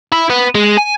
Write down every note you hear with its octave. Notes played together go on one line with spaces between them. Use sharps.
E4
B3
G#3
G#5